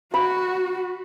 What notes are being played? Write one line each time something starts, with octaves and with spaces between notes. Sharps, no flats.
F#4 B5